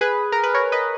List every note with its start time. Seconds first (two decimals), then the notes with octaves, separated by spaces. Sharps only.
0.01 G#4 B4
0.32 A#4
0.44 B4
0.54 A#4 C#5
0.72 B4 D#5